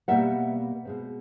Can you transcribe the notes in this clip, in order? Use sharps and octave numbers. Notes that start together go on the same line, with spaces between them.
B2 G3 A#3 E5 F#5
B2 G#3 C4